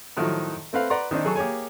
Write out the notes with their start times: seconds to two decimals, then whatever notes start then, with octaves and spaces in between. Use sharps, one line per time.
0.17 A2 D#3 F3 F#3 D#4 F#4
0.73 A3 C4 B4 F5
0.90 B4 D5 F#5 A#5 C6
1.11 D#3 C4 D4 D#4
1.25 F#3 G#4 A4 C#6
1.36 A#3 G4 G#4 C#5 G#5